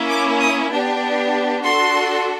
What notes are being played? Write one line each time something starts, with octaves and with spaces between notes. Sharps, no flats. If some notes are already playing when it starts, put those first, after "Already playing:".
Already playing: A#3 C#4 E4
D6
D#6
B3 D4 G4
D4 F#4 A4 C6